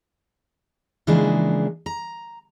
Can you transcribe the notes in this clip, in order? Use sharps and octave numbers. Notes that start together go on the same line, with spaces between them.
C#3 E3 F3 G#3 A#3 D4
A#5